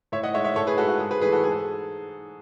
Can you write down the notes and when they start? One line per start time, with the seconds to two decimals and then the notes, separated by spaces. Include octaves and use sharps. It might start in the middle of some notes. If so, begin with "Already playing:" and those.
0.12 A2 C#5 E5
0.23 D#5 F#5
0.34 G#3 C#5 E5
0.44 C#5 E5
0.56 A2 A4 C#5
0.67 G#4 B4
0.77 G#3 F#4 A4
0.89 F#4
0.99 G#2 G#4
1.11 G#4 B4
1.21 E3 A3 G#4 B4
1.32 F#4 A4
1.43 G#2 G#4
1.51 A4